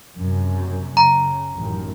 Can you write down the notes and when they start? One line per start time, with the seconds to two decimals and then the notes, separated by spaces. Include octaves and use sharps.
0.15 F#1 F#2 C3
0.97 C#3 A#5
1.57 A1 F#2 D#3